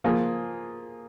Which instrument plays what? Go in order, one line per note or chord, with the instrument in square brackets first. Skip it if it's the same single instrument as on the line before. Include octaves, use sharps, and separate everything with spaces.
[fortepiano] F3 A#3 F4 G#4